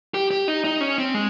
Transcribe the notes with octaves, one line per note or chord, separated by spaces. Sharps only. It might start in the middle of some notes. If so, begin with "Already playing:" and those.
G4
G4
D#4
D#4
C#4
C4
G#3